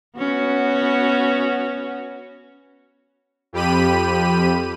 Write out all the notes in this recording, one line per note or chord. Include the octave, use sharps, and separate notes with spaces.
B3 C#4 F#4
F2 G4 B5 D#7